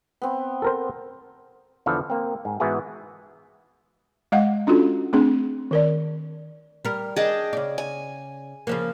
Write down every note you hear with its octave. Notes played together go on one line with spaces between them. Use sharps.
B3 C4
A4 A#4 C5
E2 D3 F3 A4 B4
A#3 C4
G#2
G#2 E3 B3 E4 F#4 G#4
G#3 D#5 F5 F#5
C#4 D4 F4 F#4 A4
A3 C4 D4 G#4
D#3 A#4 D5
G3 A#4
D4 G#4 D#5 G5 A5
C#3 D5
G#5
C#3 F3 A#3